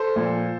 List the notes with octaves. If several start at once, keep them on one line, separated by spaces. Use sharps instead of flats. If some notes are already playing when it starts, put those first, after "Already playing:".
Already playing: A4 C5
A#2 F3